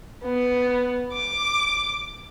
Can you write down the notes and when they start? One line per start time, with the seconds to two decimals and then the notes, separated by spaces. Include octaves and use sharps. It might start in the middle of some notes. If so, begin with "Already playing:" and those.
0.24 B3
1.13 D6